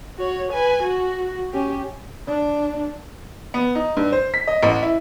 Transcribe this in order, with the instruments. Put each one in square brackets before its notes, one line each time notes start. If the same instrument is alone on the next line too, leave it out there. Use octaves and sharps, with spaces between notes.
[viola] F#4 C#5
B4 G#5
F#4
C#4 G4
[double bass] D4
[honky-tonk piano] B3
D#4
G2
C5
B6
D#5
A1
E4